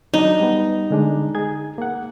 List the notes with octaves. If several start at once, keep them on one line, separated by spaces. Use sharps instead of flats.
F#3 D4 D#4
G3 B3
D3 G#3 D4
G#4 G#6
A#3 F#5